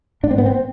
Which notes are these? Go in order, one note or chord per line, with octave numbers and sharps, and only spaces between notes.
G#2 D4
C4
B3
C4